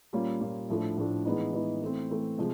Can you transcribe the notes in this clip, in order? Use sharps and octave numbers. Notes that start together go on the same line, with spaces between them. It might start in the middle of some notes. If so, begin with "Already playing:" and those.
A#2 G3 A#3 C#4 F4
A#2 G3 A#3 C#4 F4
A2 F3 A3 D4
A2 F3 A3 D4
E3 G#3 B3 D#4
E3 G#3 B3 D#4
E3 A3 C4
E3 A3 C4
C3 F3 G#3